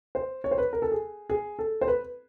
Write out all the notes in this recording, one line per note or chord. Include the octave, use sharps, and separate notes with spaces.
C5
C#5
C5
B4
A#4
A4
G#4
G#4
A4
C5
B4